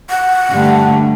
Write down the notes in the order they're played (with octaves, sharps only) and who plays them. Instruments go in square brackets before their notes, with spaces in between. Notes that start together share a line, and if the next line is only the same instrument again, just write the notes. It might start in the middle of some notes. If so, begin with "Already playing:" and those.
[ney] F#5
[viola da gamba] G2 D3 A3